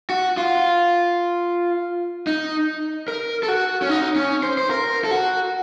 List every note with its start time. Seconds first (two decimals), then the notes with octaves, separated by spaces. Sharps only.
0.10 F#4
0.37 F4
2.27 D#4
3.08 A#4
3.43 A4
3.48 F#4
3.82 C#4
3.89 D#4
4.16 C#4
4.43 C5
4.58 C5
4.70 A#4
5.04 A4
5.11 F#4